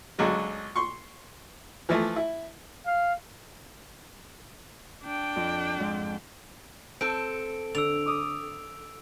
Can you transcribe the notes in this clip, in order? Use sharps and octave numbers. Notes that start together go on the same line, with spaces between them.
C#2 D3 F#3 G#3
C6 C#6
E3 F3 A3
E4
F5
D4 G5
F2
F2 G#2
C4 A4 D7
D3 E6 D7 F7
D6 D#6